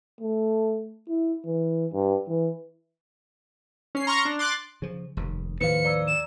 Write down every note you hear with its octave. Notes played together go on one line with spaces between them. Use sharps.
A3
E4
E3
G2
E3
C#4 C7
A#5 C6 C#6 F6 A#6
D4
C6 D6 F#6 A6
C#3 F3
F1 D#2
D#2 A2 F3 B4 C5 F5 C#7
D5 A#5 E6
E7